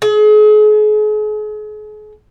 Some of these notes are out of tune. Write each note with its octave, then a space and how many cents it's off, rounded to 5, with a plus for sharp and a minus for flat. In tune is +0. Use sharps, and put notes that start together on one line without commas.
G#4 +40